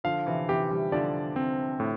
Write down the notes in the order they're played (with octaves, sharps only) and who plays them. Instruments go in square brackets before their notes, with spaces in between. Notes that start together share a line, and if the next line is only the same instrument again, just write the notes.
[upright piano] D3 F3 [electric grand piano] F5
[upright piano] C3 E3
[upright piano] C3 E3 [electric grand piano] G4
[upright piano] E3 G3
[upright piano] D3 F3 [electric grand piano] D5
[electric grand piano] C4
A2